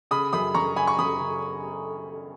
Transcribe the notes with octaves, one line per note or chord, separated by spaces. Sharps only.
C#3 B5 D#6
F#2 B5 D#6
F#2 A#5 C#6
C#3 G#5 B5
C#6
F#2 B5 D#6
C#3